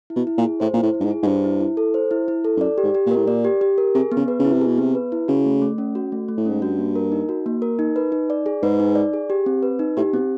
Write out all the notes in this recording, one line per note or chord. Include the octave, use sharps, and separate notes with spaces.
E4
B2
E4
A#2
G#4
A2 C5
A#2 E4
A2
E4
G2
G#2
G#4
G#2
G2 C5
E4
E4
A4
C5
E4
E4
A4
G2
F#2 D5
G4
G#2
G4
A#2 A#4
A2
A#2 D5
G4
G4
A#4
C3 G#4
B3
C#3
B4
C#3
E4
C3
G#4
B2
C3 B3
B4
E4
C#3 F#4
A3
A3
C#4
F#4
A3
A3
A2
G#2 C#4
G2 F#4
A#3
A#4
D#4
F#4
A#3
A#4
D#4
B4
D#4
D5
G#4
G#2 B4
D#4
D5
G#4
G4
C4
B4
D#4
A2 G4
B2 C4